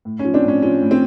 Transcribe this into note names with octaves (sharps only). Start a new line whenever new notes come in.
A2
C#4
F3
C4 D4
A2 C#4
F3 C#4
A2
C4